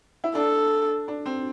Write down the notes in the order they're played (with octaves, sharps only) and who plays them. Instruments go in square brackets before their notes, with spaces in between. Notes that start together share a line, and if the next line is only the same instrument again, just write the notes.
[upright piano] E4
[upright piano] D4 [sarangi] A4
[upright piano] D4
C4